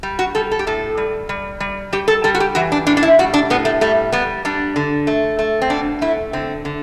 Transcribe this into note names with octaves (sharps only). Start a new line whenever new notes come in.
G3
F#4
G3 A4
A4
G4
A2 A4
G3
G3
G3
G3 G4
A4
G3 A4
F#4
G4
E3 F#4
D4
A2 D4
D4
E4
G3 F#4
D4
A2 B3
A3
G3 A3
G3 B3
G3 D4
D3
A3
A3
C4
B2 D4
A3 E4
D3 C4
D3